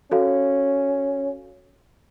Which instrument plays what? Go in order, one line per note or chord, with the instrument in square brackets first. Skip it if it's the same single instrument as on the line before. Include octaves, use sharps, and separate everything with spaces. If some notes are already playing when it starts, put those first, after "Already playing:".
[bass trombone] C#4 [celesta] F#4 A4 F5